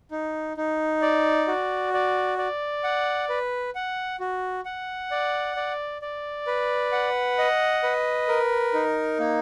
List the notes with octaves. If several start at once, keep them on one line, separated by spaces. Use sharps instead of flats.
D#4
D#4
D5
F#4
D5
D5
F#5
B4
F#5
F#4
F#5
D5
D5
D5
B4
F#5
D#5
B4
A#4
D#4
A#3